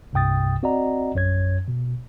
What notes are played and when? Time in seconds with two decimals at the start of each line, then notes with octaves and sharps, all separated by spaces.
0.13 C2 G2 C3 G5 D#6 A6
0.63 C4 F#4 D5 D#5 F#5 A#5
1.14 A#1 F#2 C#5 G#6
1.68 B2